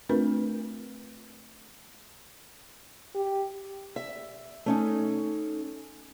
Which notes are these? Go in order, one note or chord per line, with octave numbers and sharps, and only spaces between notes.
A3 C4 D4 F4 A#4 B4
G4
E5
A3 C#4 D#4